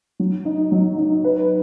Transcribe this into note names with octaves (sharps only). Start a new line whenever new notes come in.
F#3
D#4
F#3
D#4
B4